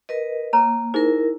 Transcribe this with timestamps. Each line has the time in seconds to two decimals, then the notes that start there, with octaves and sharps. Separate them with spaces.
0.09 A#4 B4 D#5
0.53 A#3 B4 C#5 A#5
0.94 D#4 E4 G#4 A#4 C5